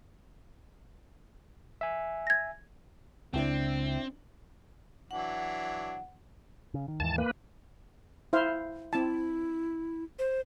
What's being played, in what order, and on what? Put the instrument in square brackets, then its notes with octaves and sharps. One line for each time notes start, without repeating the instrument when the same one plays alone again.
[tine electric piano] E5 G#5
[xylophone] G#6 A#6
[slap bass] C#2 C#3 [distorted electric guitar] C4 [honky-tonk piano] D4 E4 G5
[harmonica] E3 F#3 D4 [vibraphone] F#5
[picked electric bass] C#3
D#3
[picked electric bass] D#2 G#2 E3 [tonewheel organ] A5
[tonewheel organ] A#3 B4
[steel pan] E4 C5 F5
[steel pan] C4 A5 [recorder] E4
[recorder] C5